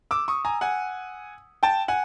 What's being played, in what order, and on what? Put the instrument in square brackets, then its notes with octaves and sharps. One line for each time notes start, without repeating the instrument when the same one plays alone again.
[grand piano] D6 E6
C#6 D#6
G#5 A#5
F#5 G#5
G5 A5
F#5 G#5